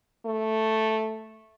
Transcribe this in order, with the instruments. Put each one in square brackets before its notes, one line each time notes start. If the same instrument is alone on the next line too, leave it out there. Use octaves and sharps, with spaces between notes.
[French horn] A3